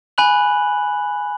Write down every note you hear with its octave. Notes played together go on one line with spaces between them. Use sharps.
G#5 B5 F#6 F#7